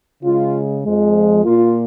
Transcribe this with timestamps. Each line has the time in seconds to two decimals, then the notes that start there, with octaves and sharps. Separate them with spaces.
0.23 C#3 G#3 F4
0.84 F2 F3 G#3
1.45 A#2 A#3 F4